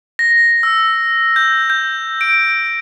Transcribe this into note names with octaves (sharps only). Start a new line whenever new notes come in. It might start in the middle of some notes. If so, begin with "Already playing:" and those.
A#6
E6
G6
G6
D7